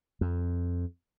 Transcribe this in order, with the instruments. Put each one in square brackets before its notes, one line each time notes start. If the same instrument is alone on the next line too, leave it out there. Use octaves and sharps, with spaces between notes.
[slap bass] F2